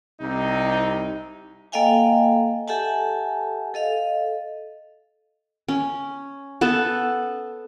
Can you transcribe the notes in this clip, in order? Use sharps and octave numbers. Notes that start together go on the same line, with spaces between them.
C2 C3 D#4
A#3 A4 D#5 F5 G5 G#5
G4 A4 E5 F#5 G#5 A5
A4 D#5 F5
C#4
B3 A4 A5